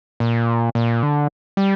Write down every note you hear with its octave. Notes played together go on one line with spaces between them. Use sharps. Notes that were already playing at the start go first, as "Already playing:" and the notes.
A#2
A#2
D3
G3